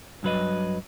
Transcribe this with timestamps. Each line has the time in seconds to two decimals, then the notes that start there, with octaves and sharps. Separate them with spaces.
0.23 G2 F#3 B4 D#5